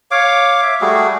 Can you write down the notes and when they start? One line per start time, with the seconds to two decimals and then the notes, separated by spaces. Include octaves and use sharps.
0.11 C#5 F5 D6
0.63 E5 D6
0.81 G3 A3 F#4 G#4